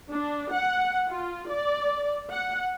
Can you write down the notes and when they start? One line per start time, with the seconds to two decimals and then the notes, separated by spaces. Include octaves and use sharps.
0.10 D4
0.52 F#5
1.09 F4
1.50 D5
2.31 F#5